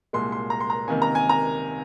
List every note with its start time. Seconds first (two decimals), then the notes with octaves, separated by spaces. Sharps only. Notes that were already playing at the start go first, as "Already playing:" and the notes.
0.13 C2 A#2 G#3 C6
0.32 C6
0.50 A#5
0.60 C6
0.70 A#5
0.88 C#2 C3 D#3 A#3 G#5
1.02 A#5
1.15 G#5
1.29 A#5